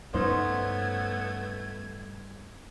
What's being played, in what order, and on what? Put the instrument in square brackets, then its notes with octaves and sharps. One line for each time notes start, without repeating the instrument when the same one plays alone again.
[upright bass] G2 C#3 [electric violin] A3 G#6 [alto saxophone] B3 [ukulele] C#4 D#4 C5